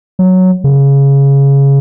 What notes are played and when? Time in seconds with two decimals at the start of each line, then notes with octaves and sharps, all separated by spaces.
0.19 F#3
0.64 C#3